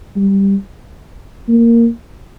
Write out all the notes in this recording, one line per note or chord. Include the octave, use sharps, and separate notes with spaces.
G3
A#3